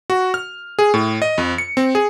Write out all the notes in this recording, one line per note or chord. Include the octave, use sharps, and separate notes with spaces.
F#4
F6
G#4
A2
D#5
F2
C#7
C4
G#4